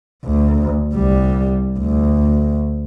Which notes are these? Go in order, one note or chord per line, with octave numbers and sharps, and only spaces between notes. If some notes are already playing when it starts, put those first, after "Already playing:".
D2
C2 G3
D2